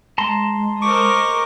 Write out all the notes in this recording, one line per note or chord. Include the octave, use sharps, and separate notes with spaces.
G#3 A5 A#5 C6
A#4 C5 D#5 C#6 D6